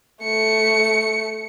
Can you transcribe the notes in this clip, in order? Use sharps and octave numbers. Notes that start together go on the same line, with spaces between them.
A3 C#7